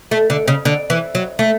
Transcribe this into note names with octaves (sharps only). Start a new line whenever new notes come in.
A3
D3
C#3
D3
E3
F#3
A3